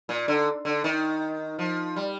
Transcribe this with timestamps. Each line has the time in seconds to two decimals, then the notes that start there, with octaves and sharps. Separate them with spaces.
0.09 A#2
0.28 D3
0.65 D3
0.84 D#3
1.59 F3
1.96 G3